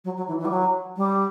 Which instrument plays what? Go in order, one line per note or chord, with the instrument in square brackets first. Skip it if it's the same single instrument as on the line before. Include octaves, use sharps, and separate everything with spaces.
[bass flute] F#3
F#3
E3
E3
G3
F#3
G3